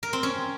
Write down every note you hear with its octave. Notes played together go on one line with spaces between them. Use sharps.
A#4
C4
C#4